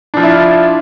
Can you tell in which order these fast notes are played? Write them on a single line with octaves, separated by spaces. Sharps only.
D4 F3 F4 E4